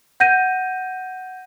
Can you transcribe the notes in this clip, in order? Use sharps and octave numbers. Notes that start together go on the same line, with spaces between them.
F#5 G6 A#6 D#7